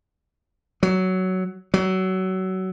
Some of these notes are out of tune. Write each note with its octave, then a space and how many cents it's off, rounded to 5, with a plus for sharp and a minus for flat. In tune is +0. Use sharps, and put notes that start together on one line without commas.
F#3 +10
F#3 +25